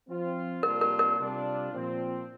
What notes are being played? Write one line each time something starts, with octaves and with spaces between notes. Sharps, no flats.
F3 C4 F4
C3 G3 A#3 D4 F4 A#4
A#4
A#4
C3 G3 D4 F4
A#2 F3 C4